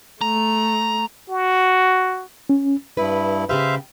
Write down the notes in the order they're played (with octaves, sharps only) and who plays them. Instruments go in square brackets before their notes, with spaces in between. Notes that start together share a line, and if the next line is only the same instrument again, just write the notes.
[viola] A3 [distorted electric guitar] A#5
[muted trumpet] F#4
[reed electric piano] C#4
[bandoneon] G2 E4 [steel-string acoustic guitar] B4
[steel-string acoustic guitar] C#3 G4 B4 [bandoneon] C5 E5 F5